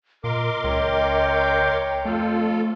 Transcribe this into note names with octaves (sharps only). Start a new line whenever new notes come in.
A#2 A#4 D#5 C6 D6
C#2 C#5 G5
F2 A3 F4 A4